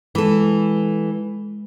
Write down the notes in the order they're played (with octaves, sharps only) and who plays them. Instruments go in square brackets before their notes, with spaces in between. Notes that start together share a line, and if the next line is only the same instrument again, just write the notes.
[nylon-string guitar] E3 A4 [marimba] G#3